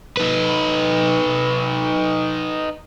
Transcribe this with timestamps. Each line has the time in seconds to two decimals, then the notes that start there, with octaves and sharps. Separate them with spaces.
0.17 D#4 B4